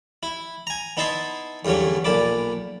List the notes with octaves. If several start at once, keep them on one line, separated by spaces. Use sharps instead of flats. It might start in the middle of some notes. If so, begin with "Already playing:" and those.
E4
G#5 A#5
B3 D#4 E4 E5 A5 C6
E2 G2 D3 F#3 C#4
B1 A#2 A5 B5 D6